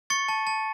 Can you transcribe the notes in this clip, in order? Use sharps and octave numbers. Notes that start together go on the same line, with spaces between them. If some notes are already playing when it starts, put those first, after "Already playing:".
C#6 A6 C#7
A5
A5